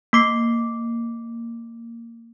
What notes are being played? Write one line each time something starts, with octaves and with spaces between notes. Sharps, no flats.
A#3 D6 C7